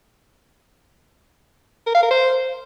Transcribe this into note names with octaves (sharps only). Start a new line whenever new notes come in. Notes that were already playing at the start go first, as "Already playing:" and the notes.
A#4
F5
A#4
C5